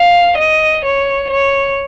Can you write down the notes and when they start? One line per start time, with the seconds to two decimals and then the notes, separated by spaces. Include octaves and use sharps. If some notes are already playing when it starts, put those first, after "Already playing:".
Already playing: F5
0.38 D#5
0.85 C#5
1.31 C#5